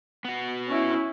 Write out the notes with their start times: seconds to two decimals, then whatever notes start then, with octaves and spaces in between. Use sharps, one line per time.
0.25 B3 F#4
0.68 C#4 E4